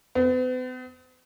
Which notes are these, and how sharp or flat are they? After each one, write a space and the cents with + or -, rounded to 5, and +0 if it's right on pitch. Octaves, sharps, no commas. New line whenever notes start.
B3 +45